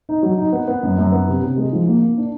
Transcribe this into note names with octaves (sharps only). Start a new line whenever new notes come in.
D#4
F#3
D#4
B3
B3
F#2
F#2
B3
C3
C3
G#3
F3
A#3
A#3
D4